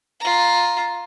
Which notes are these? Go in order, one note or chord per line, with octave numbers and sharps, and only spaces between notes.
F4 A#5